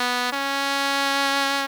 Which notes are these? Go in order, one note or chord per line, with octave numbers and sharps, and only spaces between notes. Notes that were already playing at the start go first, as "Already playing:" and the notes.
Already playing: B3
C#4